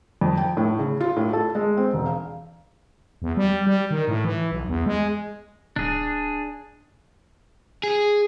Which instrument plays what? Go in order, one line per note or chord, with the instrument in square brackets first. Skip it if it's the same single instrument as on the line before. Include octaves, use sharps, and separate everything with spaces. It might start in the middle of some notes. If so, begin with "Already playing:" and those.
[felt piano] F2
G5
A2
C#3
F4
A2
A4
G#3
C4
E1
F5
[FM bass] E2
G3
G3
D#3
A2
E3
B1
E2
G#3
[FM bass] D1 [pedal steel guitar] D4 G#4
[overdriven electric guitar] G#4